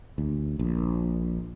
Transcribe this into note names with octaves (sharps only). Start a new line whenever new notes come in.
D2
A#1